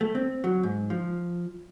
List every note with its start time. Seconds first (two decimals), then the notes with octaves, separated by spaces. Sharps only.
0.01 A3
0.15 C4
0.44 F#3
0.63 G#2
0.90 F3